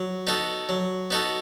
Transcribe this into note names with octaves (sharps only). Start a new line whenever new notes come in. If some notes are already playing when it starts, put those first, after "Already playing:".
Already playing: F#3
B3 D#4 F#4 A4
F#3
B3 D#4 F#4 A4